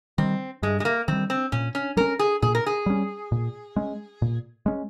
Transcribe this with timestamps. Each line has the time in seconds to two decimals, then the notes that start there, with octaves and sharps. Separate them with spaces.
0.18 D#3 G3 C4
0.63 G2 G#3
0.80 G#3
0.85 A#3
1.08 D#3 G3 C4
1.30 C4
1.52 A#2 C#4
1.75 C#4
1.97 G3 C#4 A#4
2.19 G#4
2.42 A#2 G#4
2.55 A#4
2.66 G#4
2.86 G3 C#4
3.32 A#2
3.76 G#3 C#4
4.22 A#2
4.66 G#3 C#4